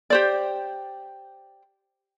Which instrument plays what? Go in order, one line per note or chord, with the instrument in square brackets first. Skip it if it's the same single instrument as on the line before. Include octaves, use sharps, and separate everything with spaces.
[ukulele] G4 C5 D5